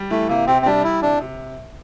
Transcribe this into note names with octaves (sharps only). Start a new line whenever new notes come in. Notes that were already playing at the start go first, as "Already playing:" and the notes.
Already playing: G3
E3 A3
C3 A#3
C3 C4
C4
G3 D4
E3 E4
C3 D4
C3